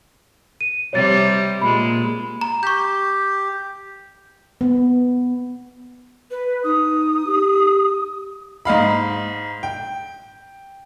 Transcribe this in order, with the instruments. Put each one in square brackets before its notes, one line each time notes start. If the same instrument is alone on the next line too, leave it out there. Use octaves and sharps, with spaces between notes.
[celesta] D#7
[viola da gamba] C3 G3 [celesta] C#5 A6
[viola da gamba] A#2 G#3 [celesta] B5
[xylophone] A#5
[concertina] G4 [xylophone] C#6 G6
[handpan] B3
[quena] B4
[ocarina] D#4 [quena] D#6
[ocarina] G4
[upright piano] G#2 D#5 F5 B5
G5